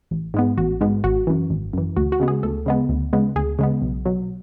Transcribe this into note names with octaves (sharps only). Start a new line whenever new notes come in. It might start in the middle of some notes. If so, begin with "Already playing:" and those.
A1
G#2 G#3 B3
A1 F#4
G#2 G#3 B3
G#1 F#4
F#2 E3
G#1
F#2 E3
D2 F#4
F#4
C#3 G#3 B3
G#4
D2 A4
C#3 G#3 B3
D2
C#3 G#3 B3
D2 G#4
C#3 G#3 B3
B1
B2 F#3